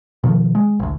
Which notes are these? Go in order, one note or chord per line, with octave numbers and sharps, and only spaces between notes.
B2 D#3 F3
G#3
A1 D2